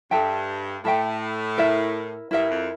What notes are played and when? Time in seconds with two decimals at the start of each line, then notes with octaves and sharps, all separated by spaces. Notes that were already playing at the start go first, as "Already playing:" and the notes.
0.11 G2 A4 E5 G5
0.85 A2 A4 E5 G5
1.58 E4 A#4 E5
2.31 G2 E4 A#4 E5
2.50 F2